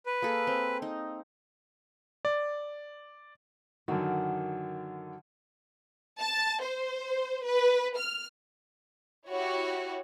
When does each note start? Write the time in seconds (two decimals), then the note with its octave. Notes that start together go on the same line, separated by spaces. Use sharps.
0.06 B4
0.22 A#3 G#4 A4
0.47 C4
0.82 D#4
2.25 D5
3.88 F#2 D3 D#3 F#4
6.20 A5
6.62 C5
7.44 B4
7.97 F6
9.29 E4 F#4 G4 C#5